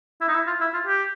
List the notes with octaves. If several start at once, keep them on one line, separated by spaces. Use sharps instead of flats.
E4
D#4
E4
F4
E4
F4
G4